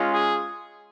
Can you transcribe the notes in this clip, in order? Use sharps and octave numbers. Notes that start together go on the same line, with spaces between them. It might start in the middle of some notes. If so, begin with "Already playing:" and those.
Already playing: G#3 C#4 F4
G#4